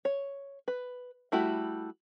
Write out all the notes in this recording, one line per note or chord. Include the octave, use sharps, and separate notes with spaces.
C#5
B4
G3 A3 E4 F#4 G4